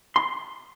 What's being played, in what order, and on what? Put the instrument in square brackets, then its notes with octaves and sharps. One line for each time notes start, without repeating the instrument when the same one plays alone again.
[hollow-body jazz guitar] C6